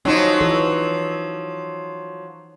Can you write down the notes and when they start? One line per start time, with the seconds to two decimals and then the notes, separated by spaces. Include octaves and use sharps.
0.05 F3 F#3 C#4 D#4
0.40 E3 A4